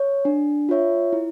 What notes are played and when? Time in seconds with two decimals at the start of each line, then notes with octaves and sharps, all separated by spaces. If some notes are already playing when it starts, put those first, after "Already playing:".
Already playing: C#5
0.25 D4
0.69 F4 C#5 E5
1.13 E4